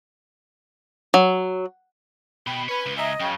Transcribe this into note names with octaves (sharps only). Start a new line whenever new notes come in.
F#3
B2 G5 B5
B4 C#5 G#5
C#2
D#5 E5 G#5 A#5
F#2 C#3 G5